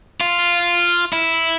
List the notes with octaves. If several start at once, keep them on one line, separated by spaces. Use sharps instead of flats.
F4
E4